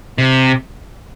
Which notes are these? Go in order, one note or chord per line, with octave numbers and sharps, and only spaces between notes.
C3